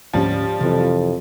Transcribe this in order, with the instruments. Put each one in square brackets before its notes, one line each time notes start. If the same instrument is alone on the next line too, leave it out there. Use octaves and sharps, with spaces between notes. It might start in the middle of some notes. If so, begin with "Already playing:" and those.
[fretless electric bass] D2 G#2 C#4 [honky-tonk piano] F3 G3
[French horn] F2 [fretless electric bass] C3 E3